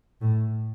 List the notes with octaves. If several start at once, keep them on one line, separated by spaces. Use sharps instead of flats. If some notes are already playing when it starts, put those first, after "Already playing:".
A2